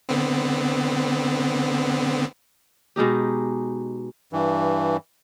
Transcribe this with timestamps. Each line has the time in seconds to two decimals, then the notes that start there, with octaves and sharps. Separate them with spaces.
0.09 D3 B3 C4
2.96 B2 G#3 D#4 G4
4.33 G2 E3